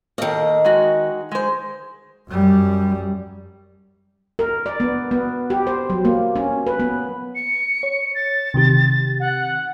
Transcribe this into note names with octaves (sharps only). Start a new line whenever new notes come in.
D#3 A#3 A4 D#5
G#3 F#4
G#3 C5
F#2 G3
A#4
D5
B3
B3
G4
C5
F#3
A#3
C#4
B4
B3
C#7
C#5
A6
C3 D#3 G4
F#5